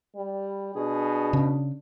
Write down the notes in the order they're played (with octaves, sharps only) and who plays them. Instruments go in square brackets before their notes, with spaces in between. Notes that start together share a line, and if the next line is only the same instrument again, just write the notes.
[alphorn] G3
[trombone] B2 [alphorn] D4 [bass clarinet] G#4
[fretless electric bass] C#3